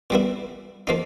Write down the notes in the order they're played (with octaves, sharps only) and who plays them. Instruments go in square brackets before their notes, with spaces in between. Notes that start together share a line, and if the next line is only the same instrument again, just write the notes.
[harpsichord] A#2 G3 B3 E4
F3 A#3 D#4